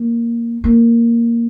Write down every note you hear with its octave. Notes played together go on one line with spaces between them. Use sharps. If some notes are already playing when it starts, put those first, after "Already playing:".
Already playing: A#3
A#3